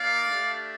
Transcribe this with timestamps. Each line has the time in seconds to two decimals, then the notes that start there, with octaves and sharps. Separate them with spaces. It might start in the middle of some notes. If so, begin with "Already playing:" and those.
Already playing: A#3 D#4 D5 F5
0.25 A3 D4 G4